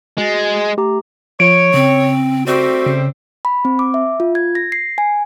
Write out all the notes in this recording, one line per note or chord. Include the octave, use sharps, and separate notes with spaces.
G#3 F#4 A6
A3 G4 A#5
F3 C#5 D7
C#3 C4
G3 A3 C4 F#4
C#3
B5
C4
D6
E5
F4
G#6
A#6
C7
G#5